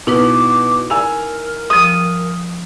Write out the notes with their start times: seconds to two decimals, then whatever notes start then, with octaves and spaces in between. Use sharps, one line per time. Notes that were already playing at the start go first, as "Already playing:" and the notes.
0.07 B2 D#4 E4 B4 D6
0.90 A#4 G#5 E6 F7
1.70 F3 G3 D#6